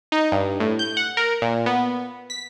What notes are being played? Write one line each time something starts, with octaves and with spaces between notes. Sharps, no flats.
D#4
G2
A2
G6
F#5
A#4
A#2
B3
B6